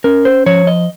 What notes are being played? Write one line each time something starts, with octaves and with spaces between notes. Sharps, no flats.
C#4 A#4
C5
F3 C#5
D#5